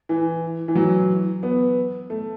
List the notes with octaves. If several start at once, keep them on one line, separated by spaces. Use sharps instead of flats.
E3
E3
F#3
B3
A3